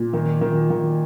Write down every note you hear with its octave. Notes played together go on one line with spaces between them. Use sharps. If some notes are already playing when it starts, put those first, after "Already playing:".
Already playing: A#2
D#3
D#3
D#3